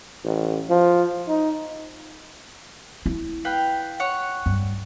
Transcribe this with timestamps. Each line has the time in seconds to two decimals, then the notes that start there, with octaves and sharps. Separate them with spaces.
0.24 A1
0.70 F3
1.28 D#4
3.06 E4
3.45 B4 F5 G5
4.00 C#5 F#5
4.46 G2